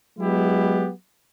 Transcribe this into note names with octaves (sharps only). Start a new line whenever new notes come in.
F#3 G#3 B3 E4 G4